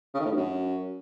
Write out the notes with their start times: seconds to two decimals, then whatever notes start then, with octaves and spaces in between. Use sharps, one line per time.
0.14 C#3
0.20 D#3
0.26 A2
0.31 G2
0.37 F#2